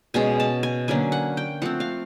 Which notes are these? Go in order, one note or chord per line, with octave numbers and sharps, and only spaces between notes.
B2 G#3 C#4 G#5
A5
G#5
D3 F#3 A#3 C#4 G#5
F#5
G5
F3 A3 C4 F#5
F5